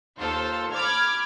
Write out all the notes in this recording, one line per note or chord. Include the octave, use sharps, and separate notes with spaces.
D#2 F4 A4 C5
B5 D6 F6 G#6